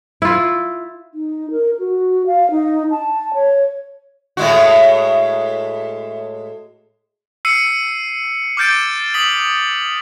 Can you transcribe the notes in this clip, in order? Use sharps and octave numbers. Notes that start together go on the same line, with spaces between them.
E4 F4
D#4
A#4
F#4
F5
D#4
A5
C#5
A2 G#3 F#4
E6 C7 C#7 D#7
D6 F6 G6 A6 D7
D#6 B6 F#7